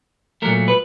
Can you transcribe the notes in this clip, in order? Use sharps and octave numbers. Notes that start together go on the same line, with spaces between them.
A#2 F#3 A3 A#4
B4